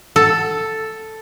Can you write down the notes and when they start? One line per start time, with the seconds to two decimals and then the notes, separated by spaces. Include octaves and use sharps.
0.16 A4